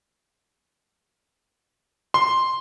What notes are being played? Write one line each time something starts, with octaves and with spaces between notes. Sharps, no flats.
C6